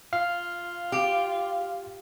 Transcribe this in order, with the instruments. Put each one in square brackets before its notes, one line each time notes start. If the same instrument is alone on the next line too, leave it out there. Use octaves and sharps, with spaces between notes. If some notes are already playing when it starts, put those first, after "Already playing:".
[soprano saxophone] F4 [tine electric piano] F5
[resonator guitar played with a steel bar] G4